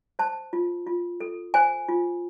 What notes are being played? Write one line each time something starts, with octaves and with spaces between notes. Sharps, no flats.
C5 A5
F4
F4
A4
C5 G#5
F4